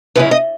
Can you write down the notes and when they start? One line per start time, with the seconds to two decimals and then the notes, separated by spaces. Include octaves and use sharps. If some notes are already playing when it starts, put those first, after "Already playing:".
0.16 F#2 C#3 G#3 C#4 E4 B4
0.31 D#5